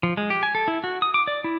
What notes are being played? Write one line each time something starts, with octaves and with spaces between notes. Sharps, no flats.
F3
G#3
G4
G#5
A4
E4
F#4
D#6
D6
D5
E4